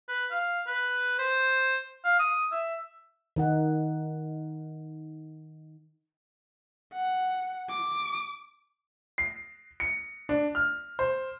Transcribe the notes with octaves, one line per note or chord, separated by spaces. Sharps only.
B4
F5
B4
C5
F5
D#6
E5
D#3 D#4 F#5
F#5
D6
C7
C#7
D4
F6
C5